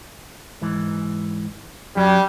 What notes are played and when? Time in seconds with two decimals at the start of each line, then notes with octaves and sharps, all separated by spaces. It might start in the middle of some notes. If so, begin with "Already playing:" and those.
0.62 G#2 E3
1.96 F#2 F#3 G3